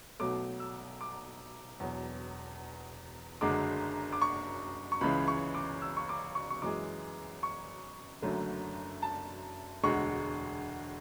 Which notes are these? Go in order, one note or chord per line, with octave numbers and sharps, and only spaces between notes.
B1 B2 F#3 A3 D6
E6
D6
E1 E2 B2 F#3
F#1 F#2 D3 G#3 D6
D6
C#6
C#6
C#2 C#3 E3 G#3 B5
C#6
D6
E6
C#6
D6
C#6
C#6
F#2 E3 G#3 D6
C#6
F#1 F#2 D3 F#3 A3
A5
E1 D2 D3 G#3 C#6